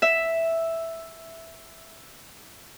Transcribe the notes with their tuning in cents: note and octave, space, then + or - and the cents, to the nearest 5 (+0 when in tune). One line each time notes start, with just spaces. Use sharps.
E5 +0